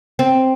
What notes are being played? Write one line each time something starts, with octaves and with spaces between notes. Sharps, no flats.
C4